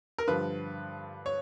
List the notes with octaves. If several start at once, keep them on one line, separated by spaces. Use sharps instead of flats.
A#4
G2 D3 F3 B4
C#5